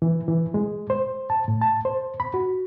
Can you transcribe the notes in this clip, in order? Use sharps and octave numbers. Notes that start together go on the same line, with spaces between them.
E3
E3
G#3
C5
A5
A2
A5
C5
B5
F#4